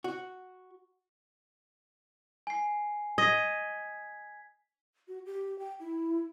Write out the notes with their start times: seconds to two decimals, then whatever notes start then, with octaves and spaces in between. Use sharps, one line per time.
0.04 F#4
2.47 G#5 C7
3.18 D#5 G#6 B6
5.08 F#4
5.26 G4
5.59 G5
5.80 E4